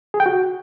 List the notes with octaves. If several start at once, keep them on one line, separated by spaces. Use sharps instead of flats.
G#4
G5
F#4